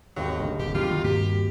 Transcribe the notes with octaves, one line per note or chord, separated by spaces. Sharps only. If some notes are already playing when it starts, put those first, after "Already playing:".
G#1 D#2 F#3 C4
D3 A3
F#1 A2 D3 G4
D3 F#3 A3 F4 G4
E2 D#3 F#4
G2 A#3 C4 G4